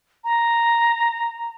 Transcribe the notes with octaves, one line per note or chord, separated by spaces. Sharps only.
A#5